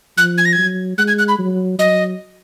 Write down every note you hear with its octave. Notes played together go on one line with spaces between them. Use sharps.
F3 F#6
G#6
A#6
G#6
F#3
G#3 F#6
G#6
F#6
B5
F#3
F#3 D#5